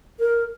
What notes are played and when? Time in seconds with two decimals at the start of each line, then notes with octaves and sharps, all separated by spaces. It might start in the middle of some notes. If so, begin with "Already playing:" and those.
0.19 A#4